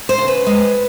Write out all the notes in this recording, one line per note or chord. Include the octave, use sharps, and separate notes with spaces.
C5
C#3
B4
G#3